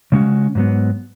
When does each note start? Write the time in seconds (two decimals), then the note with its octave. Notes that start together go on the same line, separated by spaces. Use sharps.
0.12 C#3 G#3 C#4 F#4
0.55 G#2 F#3 B3